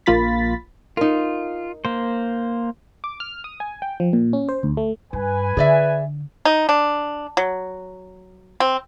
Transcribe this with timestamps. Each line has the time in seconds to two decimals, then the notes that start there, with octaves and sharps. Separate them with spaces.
0.06 A#1 A#3 F4 B5 A6 B6
0.97 D#4 F4 A#4
1.85 A#3 C5
3.04 D6
3.20 F6
3.44 D#6
3.60 G#5
3.82 G5
4.00 F3
4.13 A#2
4.33 C#4
4.49 C5
4.63 D2
4.77 A3
5.13 G2 B4 G#5
5.57 D3 G#4 D5 E5
6.45 D#4
6.69 D4
7.37 F#3
8.60 C4